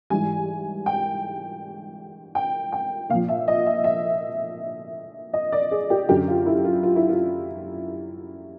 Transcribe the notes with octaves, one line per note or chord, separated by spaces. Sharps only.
G#2 E3 G3 G#5
G5
G5
G5
A#2 F3 F5
E5
D#5
E5
E5
D#5
D5
G#4
G4
F#2 D3 F#3 G4
F4
E4
F4
F4
E4
F4